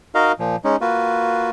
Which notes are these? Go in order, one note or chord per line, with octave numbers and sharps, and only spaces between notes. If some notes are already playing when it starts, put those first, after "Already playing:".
D#4 F#4 A#4 D#5 F5
A#2 F3
G#3 C#4 D#4
A#3 F4 F#4 B4